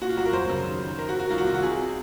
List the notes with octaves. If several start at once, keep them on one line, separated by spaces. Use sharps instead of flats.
A#2 F#4
F4
C2 F#4
A#4
F#2 C5
C#3
D#3
D#3
D#3 A#4
F#4
D#3
F#4
C2 F4
F#4
C3 F4
F#4
C3 G#4